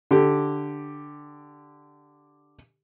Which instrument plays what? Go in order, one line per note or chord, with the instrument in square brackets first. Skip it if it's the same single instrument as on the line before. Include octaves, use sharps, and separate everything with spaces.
[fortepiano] D3 G4